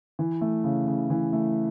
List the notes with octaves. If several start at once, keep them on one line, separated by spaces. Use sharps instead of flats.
E3
A3
C#3
C#3
E3
A3